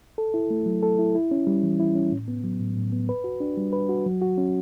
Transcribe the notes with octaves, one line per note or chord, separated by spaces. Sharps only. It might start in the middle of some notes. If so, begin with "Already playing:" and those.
A4
E4
A3
F#3
A4
E4
E4
C#4
G3
E3
E4
C#4
A2
B3
F#3
A2
A2
B3
B4
F#4
D4
G3
B4
F#4
F#3
F#4
C#4